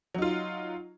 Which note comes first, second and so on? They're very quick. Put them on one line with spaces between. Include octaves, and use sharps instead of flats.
F#3 D#4 F4